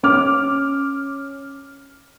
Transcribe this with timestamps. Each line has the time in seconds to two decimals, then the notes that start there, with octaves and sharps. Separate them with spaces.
0.03 C#4 D6 F6